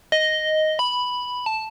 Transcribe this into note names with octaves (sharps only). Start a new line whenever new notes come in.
D#5
B5
A5